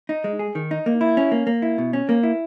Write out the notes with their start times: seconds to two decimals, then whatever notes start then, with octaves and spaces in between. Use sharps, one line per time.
0.09 D#4
0.24 G#3
0.39 G#4
0.55 D#3
0.71 D#4
0.86 A#3
1.01 E4
1.17 C#4
1.32 A#3
1.47 A#3
1.62 E4
1.78 B2
1.93 C#4
2.09 A#3
2.23 E4